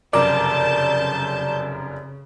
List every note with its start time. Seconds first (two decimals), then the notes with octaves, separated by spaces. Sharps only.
0.13 F1 F#2 C#3 A#4 D5 A5 G6